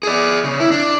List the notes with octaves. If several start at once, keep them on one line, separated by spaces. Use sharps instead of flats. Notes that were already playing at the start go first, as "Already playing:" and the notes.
G#4 D5
C#3
E4
D4